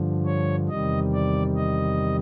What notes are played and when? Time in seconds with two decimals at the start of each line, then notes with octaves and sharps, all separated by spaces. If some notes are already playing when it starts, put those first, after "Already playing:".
Already playing: G2 D3 F3
0.26 C#5
0.68 E2 C3 D#3 G3 D#5
1.13 D5
1.56 D#5